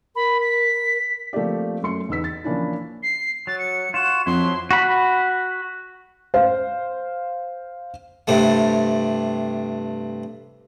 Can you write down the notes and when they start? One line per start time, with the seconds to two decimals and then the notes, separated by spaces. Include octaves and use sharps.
0.16 A#4 B5
0.40 B6
1.33 F3 A3 A#3 C4 G4 D5
1.82 F#2 A3 C6 C#7
2.09 E2 D#4 B4 E6 B6
2.24 A6
2.44 E3 F3 A#3 C#4 D4 E4
3.03 C7
3.47 F#3 A6
3.59 C#7
3.94 F4 F#4 E7
4.26 F2 F3 F#3 E4 C6
4.71 F#4 B5
6.34 C5 F5
8.27 G2 C3 A3